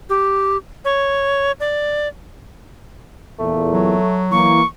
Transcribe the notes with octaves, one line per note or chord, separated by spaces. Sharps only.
G4
C#5
D5
E2 A#2 A3
F#3
E3 A#3 C#6